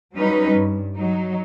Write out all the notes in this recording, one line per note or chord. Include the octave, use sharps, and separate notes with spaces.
F#3 G3 C#4 D#4 B4
G2
F#3 D#4